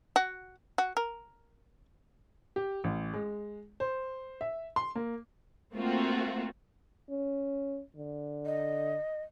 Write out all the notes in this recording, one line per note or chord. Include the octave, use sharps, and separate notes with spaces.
F#4
F#4
A#4
G4
A1
G#3
C5
E5
C6
A#3
A3 A#3 C4 F4 F#4
C#4
D3
D#5